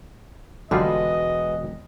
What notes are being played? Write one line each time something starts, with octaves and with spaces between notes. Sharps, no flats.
E1 D3 G3 G#3 F4 F#4 B4 D#5